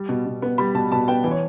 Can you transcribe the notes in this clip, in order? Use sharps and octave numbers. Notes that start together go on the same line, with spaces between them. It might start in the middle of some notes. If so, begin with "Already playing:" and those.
Already playing: G3
B2
B2
B3
G3 B5
B2 A5
B2 A5
B3 G5
E3
C#5